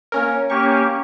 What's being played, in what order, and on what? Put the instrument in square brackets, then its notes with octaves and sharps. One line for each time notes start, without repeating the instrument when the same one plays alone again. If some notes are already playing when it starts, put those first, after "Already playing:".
[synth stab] A#3 C#4 A#4
[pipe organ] A#3 C#4 G4 [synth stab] C#6